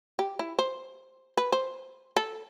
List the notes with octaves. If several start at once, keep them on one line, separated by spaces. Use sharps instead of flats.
G4
E4
C5
B4
C5
A4